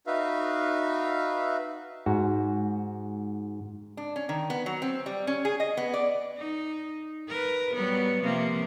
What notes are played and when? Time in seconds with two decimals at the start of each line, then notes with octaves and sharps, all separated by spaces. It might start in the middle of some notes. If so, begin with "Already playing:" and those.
0.07 D#4 F#4 B4 E5 F5
2.06 G#2 F#4
3.97 D4
4.16 C#4
4.29 D#3
4.50 B3
4.66 F#3
4.82 C4
5.06 G3
5.27 C#4
5.45 G#4
5.60 D#5
5.77 B3
5.94 D5
6.38 D#4
7.29 A#4 B4
7.75 F#3 G3 B3
8.23 C3 F3 A#3